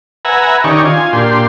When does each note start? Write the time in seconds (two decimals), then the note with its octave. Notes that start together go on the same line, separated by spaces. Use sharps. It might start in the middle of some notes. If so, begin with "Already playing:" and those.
0.25 B4 E5 F#5 G#5 A#5
0.64 D#3 C#4 D#4 G4 D5 C#6
0.85 F4 G#5
1.13 A#2 D4 G4 C6